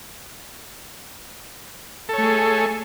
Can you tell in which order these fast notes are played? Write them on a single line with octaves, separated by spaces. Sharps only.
A4 C#5 A3 G#4